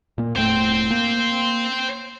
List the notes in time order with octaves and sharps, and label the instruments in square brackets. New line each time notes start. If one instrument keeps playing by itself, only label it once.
[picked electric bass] A#2 A#3
[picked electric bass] E1 A2 A3 [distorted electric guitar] C5 G5
[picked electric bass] A#3